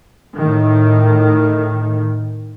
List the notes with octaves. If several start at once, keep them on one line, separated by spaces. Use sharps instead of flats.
A2 D#3